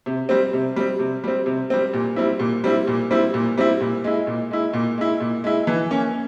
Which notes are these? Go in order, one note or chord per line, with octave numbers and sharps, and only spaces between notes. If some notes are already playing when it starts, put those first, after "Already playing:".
C3
G3 C4
C3
G3 C4
C3
G3 C4
C3
G3 C4
A#2
G3 C4 E4
A#2
G3 C4 E4
A#2
G3 C4 E4
A#2
G3 C4 E4
A#2
G#3 E4
A#2
G#3 E4
A#2
G#3 E4
A#2
G#3 E4
E3
A#3 C#4